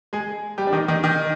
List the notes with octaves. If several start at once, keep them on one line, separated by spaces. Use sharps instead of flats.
G#3 G#4
G3 G4
D4
D#3 D#4
D#3 D#4
D#3 D#4